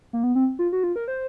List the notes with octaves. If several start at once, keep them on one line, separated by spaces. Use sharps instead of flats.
A#3
B3
C4
F4
F#4
F4
A#4
C5